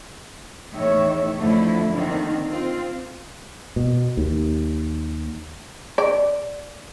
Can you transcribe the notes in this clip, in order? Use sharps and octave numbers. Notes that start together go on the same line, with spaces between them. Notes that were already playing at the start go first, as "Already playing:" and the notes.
E2 A2 D#3 C#5 E5
F2 D3 F3 A3 E4
D3 D#3 A#3 C4 D4
C4 F4
B2
D#2
D5